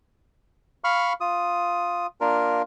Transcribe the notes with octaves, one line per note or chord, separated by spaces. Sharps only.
F5 B5 C#6 F6
F4 D#6
A#3 D4 F4 A#4